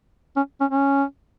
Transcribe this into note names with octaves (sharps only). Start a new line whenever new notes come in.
C#4
C#4
C#4